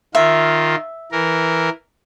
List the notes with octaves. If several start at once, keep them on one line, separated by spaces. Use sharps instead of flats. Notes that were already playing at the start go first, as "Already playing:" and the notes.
D#3 F4 E5
E3 A#4